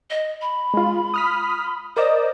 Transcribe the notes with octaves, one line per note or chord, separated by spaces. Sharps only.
D#5
B5
G#3 F4
D#6 F6 B6
A#4 C5 D5 D#5